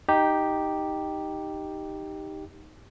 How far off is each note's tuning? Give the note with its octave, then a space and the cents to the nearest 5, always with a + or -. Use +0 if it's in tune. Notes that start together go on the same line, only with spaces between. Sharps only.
D#4 +0 G4 +0